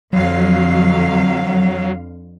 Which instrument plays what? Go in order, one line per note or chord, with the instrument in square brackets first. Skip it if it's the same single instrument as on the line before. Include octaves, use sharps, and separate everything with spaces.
[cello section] F2 D3 F5 [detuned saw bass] F#3